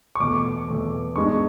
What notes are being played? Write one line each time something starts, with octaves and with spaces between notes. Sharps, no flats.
C#6
E2 B2 A3 D6
E2 B2 A3
G#2 G#3 B3 D4 C#6